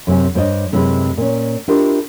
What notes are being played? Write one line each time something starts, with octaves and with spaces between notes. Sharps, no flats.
F#2 C3 C4 G#5
G2 D4 C5 C#5 D#5
F#2 C3 G#3 E4 G4 B4
A#2 C#4
D4 E4 F4 G4 A#4 D#5